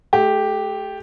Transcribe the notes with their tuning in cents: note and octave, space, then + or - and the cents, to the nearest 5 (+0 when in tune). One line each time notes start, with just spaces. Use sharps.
A3 -35 G4 +0